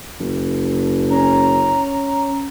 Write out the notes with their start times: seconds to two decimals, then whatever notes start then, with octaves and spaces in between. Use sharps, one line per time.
0.20 F#1
1.10 C#4 A#5